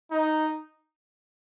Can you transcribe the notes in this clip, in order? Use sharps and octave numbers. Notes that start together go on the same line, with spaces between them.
D#4